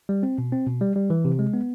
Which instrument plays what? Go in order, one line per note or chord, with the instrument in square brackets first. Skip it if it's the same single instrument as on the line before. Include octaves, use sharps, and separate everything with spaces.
[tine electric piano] G3
C4
B2
C4
B2
G3
G3
E3
C3
G#3
B3